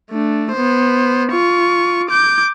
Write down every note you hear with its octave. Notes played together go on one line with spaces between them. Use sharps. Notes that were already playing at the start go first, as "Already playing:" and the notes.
A3 D4
B3 C5
F4 C#6
D6 G6